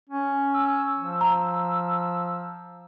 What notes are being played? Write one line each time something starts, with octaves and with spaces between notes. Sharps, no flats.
C#4
E6
F3
A#5